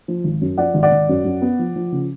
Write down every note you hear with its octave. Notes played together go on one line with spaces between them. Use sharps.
F3
G#1
F#2
F3 D5 F#5
G#1
D5 F#5
G#1
F#2
F#2
B3
F3
F3
C#3